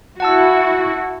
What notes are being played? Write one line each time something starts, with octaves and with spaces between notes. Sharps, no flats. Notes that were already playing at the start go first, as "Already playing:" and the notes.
E4 F#4 F#5 A5 E6